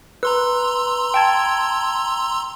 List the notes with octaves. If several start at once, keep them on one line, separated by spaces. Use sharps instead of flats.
B4 A#5 C6 E6
G5 A5 G#6